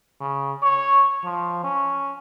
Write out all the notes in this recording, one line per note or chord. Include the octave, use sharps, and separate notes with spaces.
C#3
C#5
F3
C#4